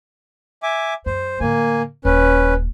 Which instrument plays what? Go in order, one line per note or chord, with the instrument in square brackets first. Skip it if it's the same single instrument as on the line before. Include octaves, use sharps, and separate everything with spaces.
[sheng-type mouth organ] E5 G#5 D6
[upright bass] F#2 [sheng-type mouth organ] C5
[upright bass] A2 D3 [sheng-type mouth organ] A#3 G#5
[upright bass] D#1 [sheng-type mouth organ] C#4 B4